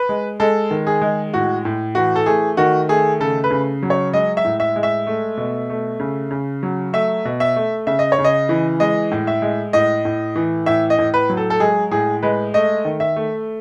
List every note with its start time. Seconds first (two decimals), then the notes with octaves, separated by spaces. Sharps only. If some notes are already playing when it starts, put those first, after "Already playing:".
Already playing: B4
0.09 G#3
0.40 G#3 A4
0.71 D#3
0.87 G#4
1.02 G#3
1.34 A2 F#4
1.65 A2
1.95 E3 F#4
2.16 A4
2.26 A3 G#4
2.57 D#3 F#4
2.89 A3 G#4
3.20 C#3 A4
3.44 B4
3.51 C#3
3.83 F#3
3.90 C#5
4.13 G#3 D#5
4.37 E5
4.45 A2
4.60 E5
4.76 G#3
4.83 E5
5.07 A3
5.37 B2
5.70 A3
6.00 C#3
6.31 C#3
6.63 F#3
6.93 A3 E5
7.25 B2
7.40 E5
7.56 A3
7.87 C#3 E5
7.99 D#5
8.12 C#5
8.19 C#3
8.24 D#5
8.49 E3
8.80 G#3 D#5
9.11 A2
9.27 E5
9.42 G#3
9.73 A2 D#5
10.05 A2
10.35 E3
10.66 A2 E5
10.90 D#5
10.98 A2
11.14 B4
11.30 F#3
11.37 A4
11.50 A4
11.60 G#3 G#4
11.91 A2 G#4
12.22 G#3 B4
12.54 A3 D#5
12.85 D#3
13.00 E5
13.16 A3